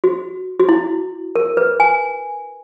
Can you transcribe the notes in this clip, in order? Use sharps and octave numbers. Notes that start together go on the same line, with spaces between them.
F#4
F#4
E4
A#4
B4
G#5